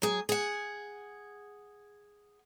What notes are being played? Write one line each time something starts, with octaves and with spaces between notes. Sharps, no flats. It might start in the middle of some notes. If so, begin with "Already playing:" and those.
F#3 G#4
G#4 F#5